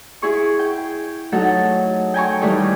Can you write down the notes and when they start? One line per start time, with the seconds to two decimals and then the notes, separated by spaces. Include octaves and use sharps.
0.22 E4 G#4 C#6
0.59 G5
1.32 F#3 A3 D#4 A4 F#5
2.14 G5 G#5 A#5 C#6
2.41 D#3 E3 G3 A3 D#4